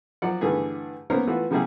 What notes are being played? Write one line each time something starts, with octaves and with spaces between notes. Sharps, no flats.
F3 F#3 D5 F#5
G2 D3 E3 A3 G#4 B4
A#3 B3 C#4 A#4 C5
E3 A3 F4 F#4 B4
C#3 F#3 G3 A3 E4 G#4